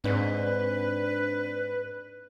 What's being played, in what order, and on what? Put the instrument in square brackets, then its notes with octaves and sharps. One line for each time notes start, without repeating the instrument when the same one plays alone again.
[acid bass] G#2 [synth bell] C4 D4 D5 [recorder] B4